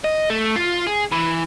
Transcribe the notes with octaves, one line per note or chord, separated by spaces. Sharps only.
D#5
A3
F4
G#4
E3